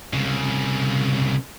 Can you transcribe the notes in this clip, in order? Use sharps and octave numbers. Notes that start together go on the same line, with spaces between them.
C2 C#3